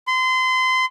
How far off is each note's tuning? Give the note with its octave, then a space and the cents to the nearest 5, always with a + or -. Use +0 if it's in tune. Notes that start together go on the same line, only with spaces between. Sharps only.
C6 -30